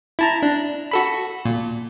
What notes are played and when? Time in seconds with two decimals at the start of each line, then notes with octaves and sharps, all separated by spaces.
0.19 E4 A5 A#5
0.43 D4
0.91 F#4 A4 B5
1.45 A#2